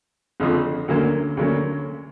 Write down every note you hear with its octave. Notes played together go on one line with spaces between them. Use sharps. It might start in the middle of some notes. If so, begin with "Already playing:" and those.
F#1 F2 D3 F3
D2 D3 F#3 A#3 C#4
D2 D3 F#3 A#3 C#4